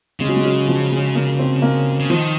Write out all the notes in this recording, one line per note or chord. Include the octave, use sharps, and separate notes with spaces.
C#3 G#3
F#3
G#3
F#3
F3
G#3
A#3
C4
A#3
C#3
D#3 F3